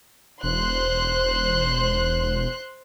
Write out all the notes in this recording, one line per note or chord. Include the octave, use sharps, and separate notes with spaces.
E1 C5 C6 F#6